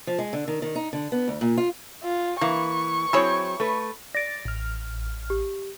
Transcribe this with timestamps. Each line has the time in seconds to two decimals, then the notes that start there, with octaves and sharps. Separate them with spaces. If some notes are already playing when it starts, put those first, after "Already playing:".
0.07 F3
0.19 G#3
0.33 D3
0.48 D#3
0.62 D#3
0.75 D#4
0.93 D3
1.12 B3
1.28 D2
1.41 A#2
1.57 F4
2.04 F4
2.41 E3 A#3 C#6
3.13 F#3 C4 E4 G#4 C#5
3.60 A3 B4
4.15 D5 A6 A#6 D7
4.45 A1 F6
5.30 G4